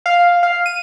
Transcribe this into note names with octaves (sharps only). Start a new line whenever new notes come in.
F5
F5
D#7